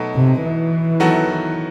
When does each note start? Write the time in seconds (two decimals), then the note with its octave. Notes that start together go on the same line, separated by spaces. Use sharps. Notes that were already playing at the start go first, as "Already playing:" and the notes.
Already playing: B2 F#3 A3 D#4
0.14 C3
0.43 E3
1.00 D#3 F#3 B3 F#4 A4